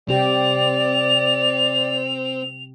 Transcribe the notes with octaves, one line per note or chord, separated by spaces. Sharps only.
C3 C4 G4 D5 F7